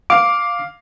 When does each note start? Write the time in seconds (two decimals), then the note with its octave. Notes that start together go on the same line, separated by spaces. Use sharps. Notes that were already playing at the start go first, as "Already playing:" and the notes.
0.10 F5 D6